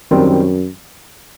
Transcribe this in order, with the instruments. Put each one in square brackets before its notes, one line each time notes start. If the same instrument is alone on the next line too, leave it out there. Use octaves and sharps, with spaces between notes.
[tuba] F#2 [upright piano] D#3 G3 C4